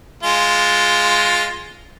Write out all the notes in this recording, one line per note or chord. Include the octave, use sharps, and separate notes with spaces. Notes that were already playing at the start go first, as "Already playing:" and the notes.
G#3 F4